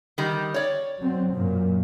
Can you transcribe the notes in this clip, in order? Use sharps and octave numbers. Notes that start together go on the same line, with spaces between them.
D#3 G3
C#5 D5
F#3 C4
F#2 A#2